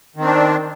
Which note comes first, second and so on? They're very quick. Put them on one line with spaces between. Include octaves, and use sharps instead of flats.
D#3 C4 D4